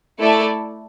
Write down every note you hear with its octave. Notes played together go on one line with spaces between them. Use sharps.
A3 E4 A4 D5